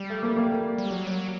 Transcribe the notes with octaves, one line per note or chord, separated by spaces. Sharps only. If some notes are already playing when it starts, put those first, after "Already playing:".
Already playing: G3
A3
A#3
A#3
G3
F#3
G3
F#3